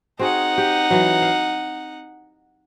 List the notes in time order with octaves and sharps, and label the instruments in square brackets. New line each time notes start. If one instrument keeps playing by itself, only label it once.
[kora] C4 F#4 G#4 [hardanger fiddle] D#4 F#5
[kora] G4
E3 F#3
F5